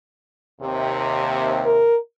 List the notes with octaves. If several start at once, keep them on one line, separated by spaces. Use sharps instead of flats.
D#2 C3
A#4